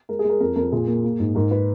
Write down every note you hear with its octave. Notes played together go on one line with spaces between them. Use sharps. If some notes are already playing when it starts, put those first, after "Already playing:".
G#3 A#4
G#4
G#3
A#4
F2 A#4
F2 A#4
A#2 G#4
A#3
A#3
G#2
G#2 A#4
B4